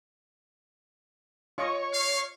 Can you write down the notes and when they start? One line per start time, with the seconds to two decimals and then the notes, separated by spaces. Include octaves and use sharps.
1.58 F4 C#5 D#5 C#6
1.93 F5